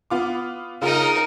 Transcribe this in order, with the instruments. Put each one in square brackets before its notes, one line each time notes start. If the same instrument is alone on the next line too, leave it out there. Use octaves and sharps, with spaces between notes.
[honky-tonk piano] B3 F4 D6
[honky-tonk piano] C#3 F4 F6 [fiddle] D#4 A#4